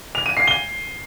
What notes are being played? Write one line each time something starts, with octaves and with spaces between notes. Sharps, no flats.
F7
D#7
C7
G7